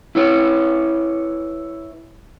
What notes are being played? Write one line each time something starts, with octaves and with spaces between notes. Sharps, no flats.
E4 B4 C#5